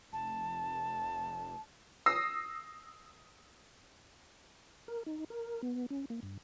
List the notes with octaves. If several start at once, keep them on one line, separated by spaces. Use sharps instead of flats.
F1 A5
D#6 E6 A#6 C7
A#4
D#4
A#4
B3
C#4
A#3
G2